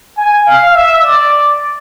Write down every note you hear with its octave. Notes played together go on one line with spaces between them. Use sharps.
G#5
F5
E5
D5